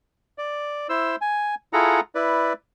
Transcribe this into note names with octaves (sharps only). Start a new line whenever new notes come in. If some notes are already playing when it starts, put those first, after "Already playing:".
D5
E4 C5 E6
G#5
E4 F4 G#4 A4 F#5 A#5
E4 B4 D5